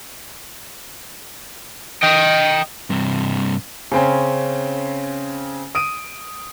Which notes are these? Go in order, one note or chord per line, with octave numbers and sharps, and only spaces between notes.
D#5 G5
G2 C3
C#3 C4 C#4
D#6 D7 D#7